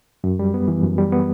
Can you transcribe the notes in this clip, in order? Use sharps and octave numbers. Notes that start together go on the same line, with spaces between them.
F#2
G3
B3
E3
F#2
G3
B3